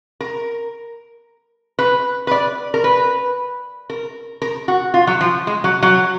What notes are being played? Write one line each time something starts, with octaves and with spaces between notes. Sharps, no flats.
A#4
B4
B4
D5
A#4
B4
A#4
A#4
F#4
F4
F#3
F3
G#3
F#3
F#3